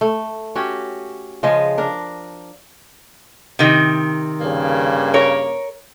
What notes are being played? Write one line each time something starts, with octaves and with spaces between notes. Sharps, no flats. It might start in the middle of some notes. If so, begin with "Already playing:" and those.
A3
C#4 F#4 G4
C#3 F3 G#3 D#5
D4 A#4
C3 D#3
G2 C#3 A#3
A#4 C#5